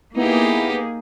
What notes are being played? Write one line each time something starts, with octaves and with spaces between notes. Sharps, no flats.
A#3 B3 D#4 E4 G4 G#4